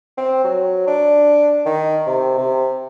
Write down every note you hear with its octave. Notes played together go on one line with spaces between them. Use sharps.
C4
F#3
D4
D#3
C3
C3